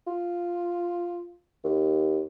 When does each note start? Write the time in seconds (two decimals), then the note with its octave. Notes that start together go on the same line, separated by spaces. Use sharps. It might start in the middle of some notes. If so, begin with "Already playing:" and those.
0.07 F4
1.64 D#2